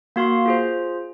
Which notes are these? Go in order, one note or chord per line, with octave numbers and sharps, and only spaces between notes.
A#3 F#4 F5 C6
F4 G#4 C5